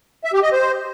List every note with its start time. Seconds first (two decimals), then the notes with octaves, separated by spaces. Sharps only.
0.24 E5
0.34 G4
0.43 D#5
0.52 C5